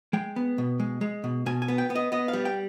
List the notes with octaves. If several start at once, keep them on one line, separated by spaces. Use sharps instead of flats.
G#3 G5
B3
B2
G#3
G#3
B2
B2 G#5
G#5
B3
G5
B3
D#5
B3 D#5
F5
G3
G5